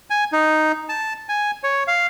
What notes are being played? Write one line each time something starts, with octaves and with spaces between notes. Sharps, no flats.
G#5
D#4
A5
G#5
C#5
F5